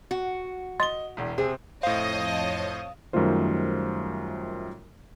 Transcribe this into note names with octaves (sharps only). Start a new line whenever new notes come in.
F#4
D#5 C6 A6 G7
E1 E2
C3 C4 G#4
F2 A2 C5 C#5 D#5 F5 A5
F#2 D#3 G3 A3 F4 C5